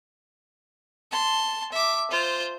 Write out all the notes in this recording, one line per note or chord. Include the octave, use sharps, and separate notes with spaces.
A5 C6
E5 D6
F4 C5